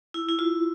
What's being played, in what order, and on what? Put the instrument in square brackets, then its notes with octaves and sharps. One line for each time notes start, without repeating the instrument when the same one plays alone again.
[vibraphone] E4
E4
F4